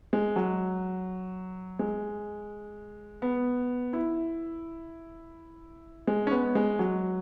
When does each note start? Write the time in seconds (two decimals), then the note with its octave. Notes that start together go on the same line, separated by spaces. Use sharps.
0.13 G#3
0.36 F#3
1.79 G#3
3.22 B3
3.93 E4
6.07 G#3
6.27 C#4
6.31 B3
6.55 G#3
6.79 F#3